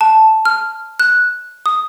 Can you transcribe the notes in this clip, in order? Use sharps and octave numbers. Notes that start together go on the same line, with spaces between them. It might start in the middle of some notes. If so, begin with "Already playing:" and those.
A5
F6
F#6
D#6